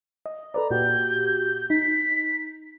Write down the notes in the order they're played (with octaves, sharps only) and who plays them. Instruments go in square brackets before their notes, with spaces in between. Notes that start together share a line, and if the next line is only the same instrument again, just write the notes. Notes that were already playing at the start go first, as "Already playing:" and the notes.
[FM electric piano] D#5
[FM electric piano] A4 B4 D5 [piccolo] A#5
[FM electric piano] A#2 F#4 G4 [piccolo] G6
[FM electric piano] D#4 [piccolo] B6